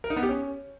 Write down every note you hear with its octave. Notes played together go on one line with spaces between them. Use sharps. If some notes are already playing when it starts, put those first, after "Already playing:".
A#4
D#4
B3
G4
C#4